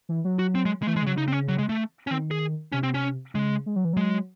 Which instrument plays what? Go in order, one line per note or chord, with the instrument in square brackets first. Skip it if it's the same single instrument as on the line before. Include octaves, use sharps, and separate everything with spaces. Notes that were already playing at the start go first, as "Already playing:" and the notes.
[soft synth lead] E3
F#3
[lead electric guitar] F#4
C4
G#3
G#3
[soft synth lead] E3 [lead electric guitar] A3
[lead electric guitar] G#3
[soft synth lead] C#3 [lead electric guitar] F#3
[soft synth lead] C#3 [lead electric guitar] D#4
[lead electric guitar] C4
C#4
F#3
G#3
A3
C#4
[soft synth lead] D#3 [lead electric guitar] C4
[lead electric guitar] G#4
[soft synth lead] C3 [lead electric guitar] C#4
[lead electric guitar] C4
C#4
[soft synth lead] C#3 [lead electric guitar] G#3
[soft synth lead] G#3
F#3
E3
[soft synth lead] F#3 [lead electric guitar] G#3